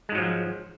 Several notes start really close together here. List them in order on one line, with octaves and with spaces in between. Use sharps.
G#3 G#2 F#3 F3